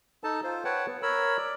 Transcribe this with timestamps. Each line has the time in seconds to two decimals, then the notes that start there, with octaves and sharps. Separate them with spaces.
0.24 D#4 A4 A5
0.44 F4 C5
0.65 B4 C#5 F#5 G5 A5
0.87 B3
1.03 A#4 C#5 B5 E6
1.37 D5